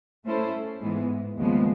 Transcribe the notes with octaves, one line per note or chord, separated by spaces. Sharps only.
A3 C#4 E4 A4 C5
G#2 E3 G#3 B3
D#2 C#3 F3 G#3 B3